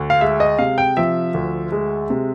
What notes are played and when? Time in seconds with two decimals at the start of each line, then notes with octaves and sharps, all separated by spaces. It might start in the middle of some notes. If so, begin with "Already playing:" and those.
Already playing: D2
0.10 F5
0.21 G#3 E5
0.40 D#5
0.59 C3 F5
0.78 G5
0.97 F3 E5
1.34 D2
1.72 G#3
2.10 C3